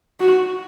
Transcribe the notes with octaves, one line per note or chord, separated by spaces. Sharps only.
F#4